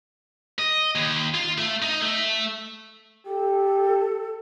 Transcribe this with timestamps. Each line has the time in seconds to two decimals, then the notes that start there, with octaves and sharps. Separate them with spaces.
0.59 D#5
0.95 D#2
1.34 F4
1.58 A3
1.82 D#4
2.02 A3
3.26 G4 A4